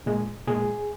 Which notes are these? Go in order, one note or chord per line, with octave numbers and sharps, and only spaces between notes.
A#2 G#3
A#2 G#3 G#4